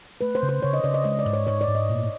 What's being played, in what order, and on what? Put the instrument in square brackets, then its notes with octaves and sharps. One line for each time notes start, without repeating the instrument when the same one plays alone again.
[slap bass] A3 [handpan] B4
[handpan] C5
[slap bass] C#3
[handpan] C5
[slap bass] C#3 [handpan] C#5
[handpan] D#5
[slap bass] C#3 [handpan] D5
[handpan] D#5
[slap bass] G#3 [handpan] D#5
[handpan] D5
[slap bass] G#2
[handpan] C#5
[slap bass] G#2 [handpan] C#5
[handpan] D5
[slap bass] G#2
[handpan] D#5
[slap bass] A#2